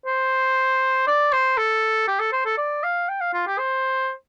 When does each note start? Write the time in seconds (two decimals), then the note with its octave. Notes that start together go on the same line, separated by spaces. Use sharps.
0.06 C5
1.08 D5
1.33 C5
1.57 A4
2.08 G4
2.20 A4
2.33 C5
2.45 A4
2.58 D5
2.84 F5
3.09 G5
3.21 F5
3.33 F4
3.47 G4
3.59 C5